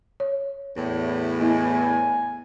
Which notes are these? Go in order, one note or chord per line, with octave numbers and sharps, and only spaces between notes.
C#5
E2 A2
B3 E4 D#5 G#5